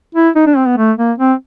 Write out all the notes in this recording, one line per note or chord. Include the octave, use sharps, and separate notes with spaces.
E4
D#4
D4
C4
B3
A3
A#3
C4